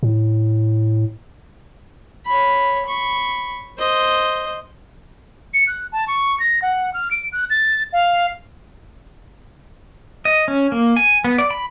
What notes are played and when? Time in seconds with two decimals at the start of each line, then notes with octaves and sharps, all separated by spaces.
0.03 A2
2.26 C#5 B5
2.86 B5 C#6
3.78 C5 D#5
5.54 C#7
5.67 F#6
5.92 A5
6.08 C#6
6.40 A#6
6.62 F#5
6.94 F6
7.11 D7
7.32 F#6
7.50 A6
7.93 F5
10.25 D#5
10.48 C#4
10.72 A#3
10.96 G#5
11.24 B3
11.38 D5
11.51 B5